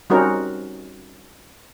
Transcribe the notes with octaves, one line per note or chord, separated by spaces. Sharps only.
G3 C4 C#4 D#4 F#4 A#4